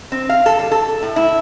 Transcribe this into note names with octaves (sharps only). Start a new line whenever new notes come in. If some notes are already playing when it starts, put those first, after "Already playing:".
C4
F5
A4
G3
A4
A2
E4